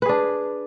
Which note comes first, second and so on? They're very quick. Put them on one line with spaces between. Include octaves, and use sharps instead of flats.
B4 G#4 D4